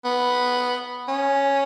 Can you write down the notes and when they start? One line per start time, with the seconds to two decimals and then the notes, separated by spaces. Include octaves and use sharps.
0.05 B3
1.08 C#4